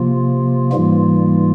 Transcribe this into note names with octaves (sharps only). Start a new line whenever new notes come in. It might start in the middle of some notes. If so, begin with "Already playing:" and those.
Already playing: C3 F3 A#3 F4
G#2 E3 G3 A#3 F4